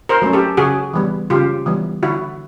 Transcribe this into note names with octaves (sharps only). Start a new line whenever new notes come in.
A#4 C5
F#3 A3 C#4
G4 A4
C#3 F#4 G#4
E3 G3 B3
C#3 F4 G4
E3 G3 B3
D3 E4 F#4